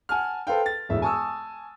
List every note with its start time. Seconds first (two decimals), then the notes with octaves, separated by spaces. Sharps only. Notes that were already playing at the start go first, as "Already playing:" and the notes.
0.09 F#5 G#5 A5 F6
0.47 A4 B4 C5 F5 G5
0.66 A6
0.89 E1 A2 E5
1.02 G#5 A5 C#6 D#6 E6